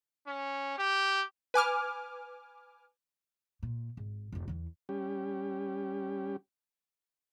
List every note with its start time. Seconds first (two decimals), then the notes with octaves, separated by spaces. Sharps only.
0.27 C#4
0.78 G4
1.54 B4 G#5 D6 F6
3.63 A#2
3.97 G#1
4.32 F1 F4
4.48 E2 E3
4.89 G3 C#4 G4